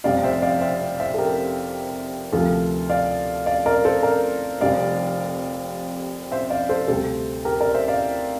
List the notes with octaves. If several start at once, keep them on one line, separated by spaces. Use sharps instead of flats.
F1 F2 C3 G3 D5 F5
C5 E5
D5 F5
C5 E5
C5 E5
A4
G4 A#4
D2 C3 F3 F4 A4
D5 F5
D5 F5
A#4 D5
A4 C5
A#4 D5
F1 F2 C3 G3 D5 F5
C5 E5
D5 F5
A4 C5
D2 C3 G3 A4 C5
G4 A#4
A#4 D5
C5 E5
D5 F5